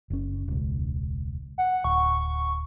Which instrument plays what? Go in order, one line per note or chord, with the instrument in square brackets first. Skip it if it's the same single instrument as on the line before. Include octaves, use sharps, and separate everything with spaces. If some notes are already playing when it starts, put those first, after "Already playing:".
[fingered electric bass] F#1 C#4
E1 C#2
[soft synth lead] F#5
[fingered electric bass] D1 [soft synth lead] C#6